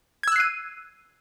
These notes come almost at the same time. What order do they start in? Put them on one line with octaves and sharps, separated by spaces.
G#6 E6 F#6 C7 D#7